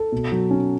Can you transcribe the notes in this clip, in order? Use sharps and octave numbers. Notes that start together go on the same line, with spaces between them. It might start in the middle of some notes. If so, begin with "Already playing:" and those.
Already playing: A4
B2
F#3
C#4